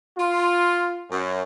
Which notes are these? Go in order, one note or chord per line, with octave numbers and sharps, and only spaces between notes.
F4
F#2